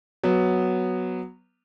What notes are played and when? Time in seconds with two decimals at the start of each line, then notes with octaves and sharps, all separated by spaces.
0.23 F#3 B3